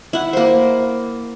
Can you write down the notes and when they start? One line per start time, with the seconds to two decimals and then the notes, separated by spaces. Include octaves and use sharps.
0.13 E4 F#5
0.33 A#3 C5